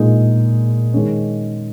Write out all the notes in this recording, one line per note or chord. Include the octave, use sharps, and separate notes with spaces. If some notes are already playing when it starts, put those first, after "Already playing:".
Already playing: A#2 G#3 D#4
D#3 G#3 C#4